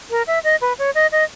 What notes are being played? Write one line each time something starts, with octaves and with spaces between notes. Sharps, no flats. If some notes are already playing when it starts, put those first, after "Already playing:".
A#4
E5
D#5
B4
C#5
D#5
D#5